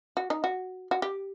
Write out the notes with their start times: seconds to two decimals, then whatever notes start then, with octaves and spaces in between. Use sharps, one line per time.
0.17 F#4
0.30 D#4
0.44 F#4
0.91 F#4
1.02 G4